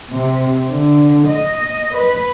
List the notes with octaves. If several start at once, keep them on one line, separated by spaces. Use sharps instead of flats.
C3
D3
D#5
B4